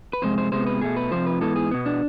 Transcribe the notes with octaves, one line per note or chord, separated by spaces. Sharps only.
B4
F2 C3 G#3 C5
C5
C3 G#3 B3 C5
B4
B2 A3 G#4
B4
F2 C3 F3 C5
B4
G#2 E3 B3 A4
G#4
B2 B3
D4